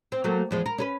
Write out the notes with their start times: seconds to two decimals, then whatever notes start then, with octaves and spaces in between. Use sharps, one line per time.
0.12 C4
0.24 F#3 A3 A#3
0.51 E2 F3 G#3
0.66 A#4
0.78 C#4 A#4 B4